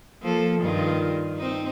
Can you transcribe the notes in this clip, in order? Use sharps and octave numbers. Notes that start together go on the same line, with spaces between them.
F3 A#3 A4
G2 D#3 F4
C4 D#4